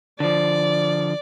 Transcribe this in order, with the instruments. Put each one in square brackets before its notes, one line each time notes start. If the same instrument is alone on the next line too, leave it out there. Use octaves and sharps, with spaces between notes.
[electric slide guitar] D3 F3 [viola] D5